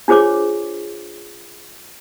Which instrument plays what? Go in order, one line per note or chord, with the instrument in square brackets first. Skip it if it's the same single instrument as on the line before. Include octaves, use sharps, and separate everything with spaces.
[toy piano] D4 F4 G#4 C5 C#5 D6